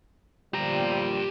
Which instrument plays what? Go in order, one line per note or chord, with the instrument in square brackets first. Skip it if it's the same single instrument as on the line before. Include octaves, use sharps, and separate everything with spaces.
[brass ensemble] A#2 F3 G3 [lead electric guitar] G4 A#5